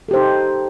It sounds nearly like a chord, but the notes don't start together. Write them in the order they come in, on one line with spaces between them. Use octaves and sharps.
A4 G4 C5 D#4